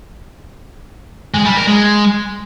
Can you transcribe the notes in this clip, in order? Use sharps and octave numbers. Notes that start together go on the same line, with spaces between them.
G#3
G3
A#4
G#3